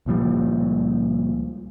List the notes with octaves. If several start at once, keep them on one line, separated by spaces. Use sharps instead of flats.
C#2 A#2 F3 G3